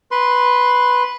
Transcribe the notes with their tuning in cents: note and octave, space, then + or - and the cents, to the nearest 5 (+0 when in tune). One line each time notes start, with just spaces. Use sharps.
B4 +0 C6 +0